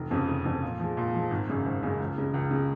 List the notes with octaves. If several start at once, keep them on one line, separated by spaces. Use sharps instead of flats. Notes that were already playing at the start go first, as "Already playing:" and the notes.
Already playing: F1
F2 C#3
F1
F2 C#3
A#2
F3 G#3
A#2
F3 G#3
G#1
F#2 C#3 G#3
G#1
F#2 C#3 G#3
C#2
C#3 G#3
C#2
C#3 G#3